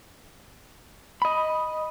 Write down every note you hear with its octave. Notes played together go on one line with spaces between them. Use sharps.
D#5 B5